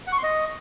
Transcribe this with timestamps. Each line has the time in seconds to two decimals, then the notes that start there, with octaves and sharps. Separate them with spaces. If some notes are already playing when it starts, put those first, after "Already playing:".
0.07 F#5
0.12 C#6
0.18 C6
0.23 D#5